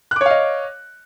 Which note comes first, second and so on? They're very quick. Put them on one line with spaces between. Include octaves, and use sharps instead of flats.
F#6 D6 C#5 F5 D#5